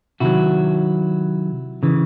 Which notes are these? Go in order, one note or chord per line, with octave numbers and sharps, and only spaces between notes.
C3 D#3 F#3 E4 F#4
C#3 E3